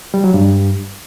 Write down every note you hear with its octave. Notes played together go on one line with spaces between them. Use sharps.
G3
F#3
G2